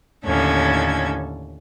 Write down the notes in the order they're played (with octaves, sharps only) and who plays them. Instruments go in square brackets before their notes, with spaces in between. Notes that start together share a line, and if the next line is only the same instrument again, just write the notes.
[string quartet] D#2 A2 D3 C#4 A4 G#6